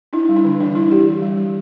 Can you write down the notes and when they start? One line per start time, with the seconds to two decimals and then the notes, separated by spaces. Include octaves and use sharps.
0.13 D4 E4
0.29 G3
0.37 D4
0.45 D3
0.60 E3 D4
0.75 G3 E4
0.91 E3 G4
1.07 E3
1.22 G3
1.38 E3